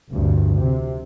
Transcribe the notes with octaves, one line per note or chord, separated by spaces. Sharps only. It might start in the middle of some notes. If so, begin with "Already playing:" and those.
F1 D2 G2
C3